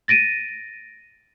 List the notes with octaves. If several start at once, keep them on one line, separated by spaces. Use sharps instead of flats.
A6 A#6 D7 D#7